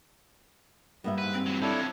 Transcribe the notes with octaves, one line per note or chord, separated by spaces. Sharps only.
G2 A#3 B3 E5
G#2 B4
C4
E3 F#3
F3 C#4 D4 E4 A4